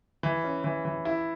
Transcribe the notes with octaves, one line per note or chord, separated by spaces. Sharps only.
E3
C#4
E3
E3
E4